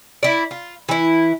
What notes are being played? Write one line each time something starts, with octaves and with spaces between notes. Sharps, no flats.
E4 D5
F4
E3 E4